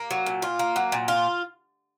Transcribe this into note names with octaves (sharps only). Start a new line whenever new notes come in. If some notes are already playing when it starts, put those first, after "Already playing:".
Already playing: A#3
F#3
A#2
F4
A#3
F#3
A#2
F4